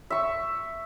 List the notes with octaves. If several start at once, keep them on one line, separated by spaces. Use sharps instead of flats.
E5 C#6